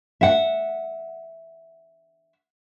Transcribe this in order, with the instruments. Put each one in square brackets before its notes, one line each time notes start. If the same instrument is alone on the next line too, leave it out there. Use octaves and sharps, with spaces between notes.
[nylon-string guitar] E5 F#5